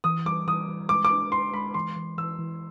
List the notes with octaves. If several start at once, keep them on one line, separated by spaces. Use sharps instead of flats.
E3 D#6
G3 D6
E3 D#6
E3
G#3 D6
D6
D4
G#3 C6
G#3 B5
E3 C6
E3
E3 E6
E3